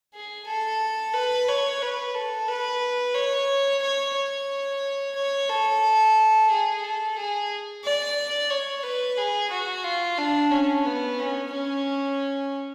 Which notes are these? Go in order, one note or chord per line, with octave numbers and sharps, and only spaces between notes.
G#4
A4
B4
C#5
B4
A4
B4
C#5
C#5
C#5
C#5
A4
G#4
A4
G#4
D5
C#5
B4
G#4
F#4
F4
D4
C#4
B3
C#4
C#4